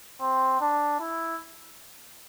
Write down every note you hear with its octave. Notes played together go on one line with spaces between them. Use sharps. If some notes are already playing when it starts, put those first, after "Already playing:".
C4
D4
E4